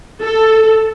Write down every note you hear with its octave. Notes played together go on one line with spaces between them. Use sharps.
A4